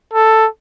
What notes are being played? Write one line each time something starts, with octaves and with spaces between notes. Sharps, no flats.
A4